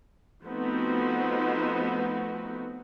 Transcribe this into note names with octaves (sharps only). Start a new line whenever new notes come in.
F3 A3 B3 C4 D#4 F#4